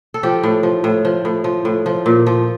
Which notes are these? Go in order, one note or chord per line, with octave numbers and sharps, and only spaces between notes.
A4
F3 G4
A2
F3
A2
F3
A2
F3
A2
F3
A#2
F3